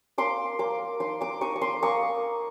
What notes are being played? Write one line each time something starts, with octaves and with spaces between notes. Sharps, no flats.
A#3 C6 D6
A#3 C6 D6
D#4 C6 D6
C6 D6
D#4 C#6 D#6
C#6
C6 D6
A#3 C#6 D#6